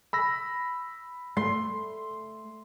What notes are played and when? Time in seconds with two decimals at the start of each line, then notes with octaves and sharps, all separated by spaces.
0.13 B5 E6 A#6
1.37 A3 C6